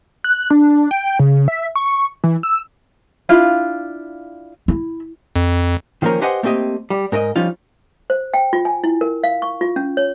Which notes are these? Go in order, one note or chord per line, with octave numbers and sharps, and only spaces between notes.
F#6
D4
G5
C#3
E5
C#6
E3
E6
D4 E4 F4 F5
E4
F2
D#3 F3 A#3 C#4 A#4
G4 B4 C5 D#5 F#5 G#5
A3 A#3 C4 G4 D#5
G3
G#2 A#4 C5 D#5
F3 G3 C#4 D#4 F4
C5
G5
F4
G#5
E4
A#4
F5
C#6
F4
C#4
C#5